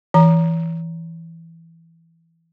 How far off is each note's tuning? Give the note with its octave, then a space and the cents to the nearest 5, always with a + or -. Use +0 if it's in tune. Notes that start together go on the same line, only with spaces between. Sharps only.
E3 +5 A#5 +5